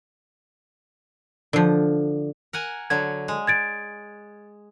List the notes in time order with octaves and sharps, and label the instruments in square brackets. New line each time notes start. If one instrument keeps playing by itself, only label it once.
[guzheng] D3 F3
[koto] A#4 F#5 G#5
[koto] D3 F#3 [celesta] G#6
[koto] G#3
[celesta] G#6 A6 D7